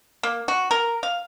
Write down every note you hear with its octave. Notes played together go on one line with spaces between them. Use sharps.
A#3
F#4
A#4
F5